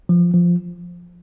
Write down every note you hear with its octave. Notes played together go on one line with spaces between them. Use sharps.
F3
F3